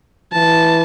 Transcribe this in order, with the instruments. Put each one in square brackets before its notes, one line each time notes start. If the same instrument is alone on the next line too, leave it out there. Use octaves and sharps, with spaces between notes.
[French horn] E3 [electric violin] A5